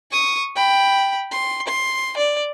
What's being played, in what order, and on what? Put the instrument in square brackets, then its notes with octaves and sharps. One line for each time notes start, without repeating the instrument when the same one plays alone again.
[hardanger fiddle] C#6 D#6
G5 B5
C6
C6
D5